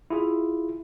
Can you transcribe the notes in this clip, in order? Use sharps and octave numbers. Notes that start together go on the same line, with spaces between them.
E4 F4 G#4